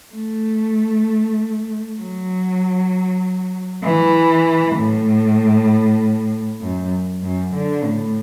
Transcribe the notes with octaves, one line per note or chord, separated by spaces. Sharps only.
A3
F#3
E3
A2
F#2
F#2
D3
A2